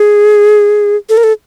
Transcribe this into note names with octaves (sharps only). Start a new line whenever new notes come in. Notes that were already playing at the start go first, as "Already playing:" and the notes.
Already playing: G#4
A4
A#4
A4